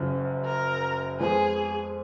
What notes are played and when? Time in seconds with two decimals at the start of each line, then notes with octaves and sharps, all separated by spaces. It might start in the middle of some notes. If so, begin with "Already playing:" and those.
Already playing: F#1 F#2 C#3 F3
0.45 A#4
1.20 F2 F3 G#3 B3 G#4